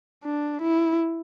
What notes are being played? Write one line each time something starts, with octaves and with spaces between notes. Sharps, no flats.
D4
E4